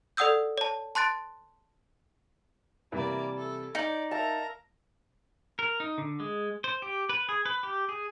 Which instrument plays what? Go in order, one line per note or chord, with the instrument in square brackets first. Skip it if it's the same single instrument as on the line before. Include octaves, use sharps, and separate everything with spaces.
[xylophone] A4 D5 F#5 D#6 E6 G6
C#5 A5
A5 C6 F#6 A6 D7
[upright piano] C3 E3 G3 [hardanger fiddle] A#3 D5
[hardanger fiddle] A4
[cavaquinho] D#4 [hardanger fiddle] D5 [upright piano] C#7 F#7
[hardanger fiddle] A#4 A#5 [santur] E5 F5 A5
[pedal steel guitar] A#4
D#4
D3
G#3
C5
G4
B4
G#4
B4
G4
G#4